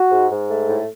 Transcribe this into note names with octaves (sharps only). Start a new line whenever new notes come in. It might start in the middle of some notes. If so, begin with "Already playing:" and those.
Already playing: F#4
G#2
G#2
A3
A2